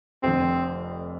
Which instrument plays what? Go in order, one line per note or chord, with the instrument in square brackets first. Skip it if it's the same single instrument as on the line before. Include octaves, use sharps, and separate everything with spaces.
[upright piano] F1 F2 D3 [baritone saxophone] C4